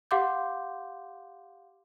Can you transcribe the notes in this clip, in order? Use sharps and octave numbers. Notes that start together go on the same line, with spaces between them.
G4 F5 F#5 C6 D6 G6